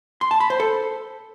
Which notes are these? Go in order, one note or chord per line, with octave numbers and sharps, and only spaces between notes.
C6
A5
B5
C5
A4